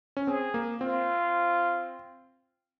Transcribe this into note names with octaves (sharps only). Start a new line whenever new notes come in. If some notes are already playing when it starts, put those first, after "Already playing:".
C#4
C4 G#4
A#3
C4 F4